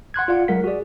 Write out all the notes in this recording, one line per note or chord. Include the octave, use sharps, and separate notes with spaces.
F#5 C6 F#6 G#6
F4 D5 F5 F#5
F#3 G#3 A#4 F#5 B6
F#4 G#4 D5